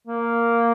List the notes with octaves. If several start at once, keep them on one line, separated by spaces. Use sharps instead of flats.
A#3